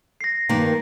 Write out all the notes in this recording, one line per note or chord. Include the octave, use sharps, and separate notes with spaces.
A#6 C7
G2 D#3 A#3